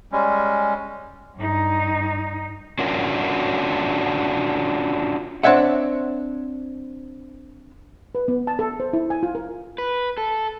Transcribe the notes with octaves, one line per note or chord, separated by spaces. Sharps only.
G3 G#3 C#4
G2 D#4
C#4 D4 F4 F#4 A#4 C#5
C4 D4 C#5 E5 F#5
B4
B3
A5
A4
C5
E4
G#5
F4
A#4
B4
A4